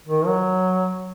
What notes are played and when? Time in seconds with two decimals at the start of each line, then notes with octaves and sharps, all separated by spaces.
0.07 D#3
0.26 F#3